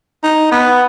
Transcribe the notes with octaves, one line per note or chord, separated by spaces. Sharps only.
D#4
B3